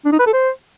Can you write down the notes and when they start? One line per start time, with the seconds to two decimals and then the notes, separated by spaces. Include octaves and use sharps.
0.05 D4
0.12 D#4
0.19 B4
0.26 A4
0.33 C5